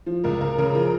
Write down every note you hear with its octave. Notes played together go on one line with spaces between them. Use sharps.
F3
C#2 A#4
C#2 A#4
C#3 A#4
F3 A#4